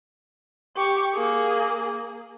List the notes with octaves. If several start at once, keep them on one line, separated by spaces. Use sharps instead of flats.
G4 C#6
A#3 G#4